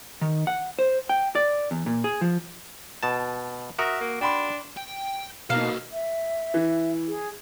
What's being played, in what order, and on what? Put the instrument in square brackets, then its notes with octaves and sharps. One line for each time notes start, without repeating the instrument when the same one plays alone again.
[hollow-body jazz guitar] D#3
F#5
C5
G5
D5
E2
A#2
G#4
F3
[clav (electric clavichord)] B2 A5
[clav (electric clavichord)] F#4 A#4 [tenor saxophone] E5 [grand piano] D#6
[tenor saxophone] A#3
[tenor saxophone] D4 [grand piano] G5 B5 C6
[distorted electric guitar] G5
[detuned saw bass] B2 [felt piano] A#3 D#4 [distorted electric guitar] F#4 A4 [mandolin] F5
[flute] E5
[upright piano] E3
[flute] G#4